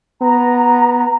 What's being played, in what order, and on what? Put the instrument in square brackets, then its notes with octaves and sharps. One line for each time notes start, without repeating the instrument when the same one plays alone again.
[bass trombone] B3 [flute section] A#5